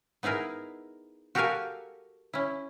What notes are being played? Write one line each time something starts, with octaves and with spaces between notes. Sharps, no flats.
B3 D#4 E4 G#4 A#4
F#4 G4 A4 A#4 F5 G#5
C#4 E4